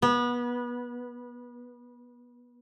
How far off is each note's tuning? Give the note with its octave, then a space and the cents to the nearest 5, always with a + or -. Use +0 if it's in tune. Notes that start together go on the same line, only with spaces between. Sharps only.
B3 -25